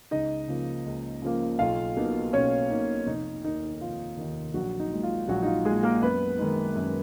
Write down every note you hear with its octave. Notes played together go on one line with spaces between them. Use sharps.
C#2 D#4 D#5
C#3 F3 A#3
C#2
C#3 F3 A#3
B1 F4 F5
B2 A#3 D#4
B1 C#4 C#5
B2 A#3 D#4
F1 D#4
D#2 D#3 D#4
F1 F4
D#2 D#3
A#1 F#3 F#4
D#4
A#2 G#3
F4
A#1 F#3 F#4
D#4
F4
A#2 G#3 G#4
A#3 A#4
F#2 B3 B4
D#3 G#3 D#4
F#2